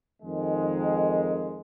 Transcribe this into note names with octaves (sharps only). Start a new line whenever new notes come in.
F2 D#3 G#3